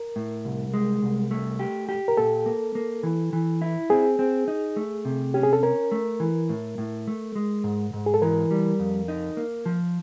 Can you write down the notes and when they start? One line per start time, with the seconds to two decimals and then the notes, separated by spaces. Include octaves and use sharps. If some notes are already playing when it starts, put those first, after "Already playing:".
Already playing: A#4
0.16 A2
0.45 C2
0.74 G#3
1.02 C2
1.31 A3
1.59 G4
1.89 G4
2.08 A#4
2.17 A#2 A4
2.46 A#3
2.75 A#3
3.03 E3
3.33 E3
3.62 E4
3.90 C4 G#4
4.19 C4
4.48 D#4
4.76 A3
5.05 C3
5.34 C#4 G4
5.43 G#4
5.53 A4
5.63 C#4 A#4
5.92 A3
6.20 E3
6.49 A2
6.78 A2
7.07 A3
7.35 G#3
7.64 G#2
7.93 G#2
8.06 G#4
8.14 A4
8.22 E3 A#4
8.51 G3
8.79 F2
9.08 D#4
9.37 A#3
9.66 F3